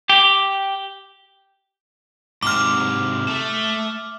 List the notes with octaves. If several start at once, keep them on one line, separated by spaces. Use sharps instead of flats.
G4
G#2 C3 D6 F6
A3 A4